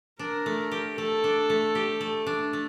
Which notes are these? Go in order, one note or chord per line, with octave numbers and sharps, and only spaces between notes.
D4 A#4
A3
G4
A3 A4
D4
A3
G4
A3
D4
A3